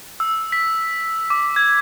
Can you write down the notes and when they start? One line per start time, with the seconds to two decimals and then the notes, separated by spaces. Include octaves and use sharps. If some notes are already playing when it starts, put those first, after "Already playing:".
0.20 E6
0.52 B6
1.30 D6
1.56 G#6